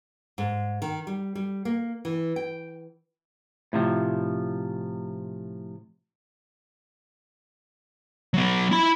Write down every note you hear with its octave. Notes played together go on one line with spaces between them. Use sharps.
G#2
D#3
G3
G3
A#3
E3
G5
A2 C3 F3
F#3 B3
E4 B5